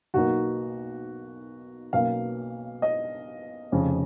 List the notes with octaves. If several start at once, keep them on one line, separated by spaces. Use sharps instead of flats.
B1 B2 A#3 D#4 F#4
B1 B2 A#3 C#4 F5
D#5
F1 F2 C#3